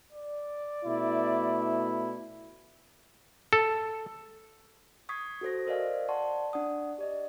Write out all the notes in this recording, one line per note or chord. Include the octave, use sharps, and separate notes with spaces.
D5
B2 A3 E4
A4
C#6 D#6 G#6 B6 C7
F#4 A4 C5 A#6
A#4 C5 D5 D#5 F5 G#5
D5 F#5 A5 C6 C#6
D4 D5 F#5 D#6
G4 D5 D#5